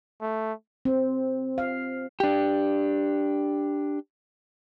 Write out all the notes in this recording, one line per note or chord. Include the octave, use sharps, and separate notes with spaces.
A3
C4
F5
D4 G4